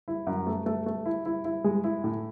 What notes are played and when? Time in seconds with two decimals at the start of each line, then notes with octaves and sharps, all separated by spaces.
0.08 E4
0.27 F#2
0.47 A3
0.66 A3
0.86 A3
1.06 E4
1.26 E4
1.45 E4
1.64 G#3
1.84 E4
2.04 A2